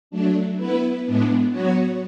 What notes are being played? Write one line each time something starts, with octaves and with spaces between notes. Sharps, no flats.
F#3 A3 D4
B3 E4 B4
A2 G#3 B3 D4
F#3 B3 F#4 C#5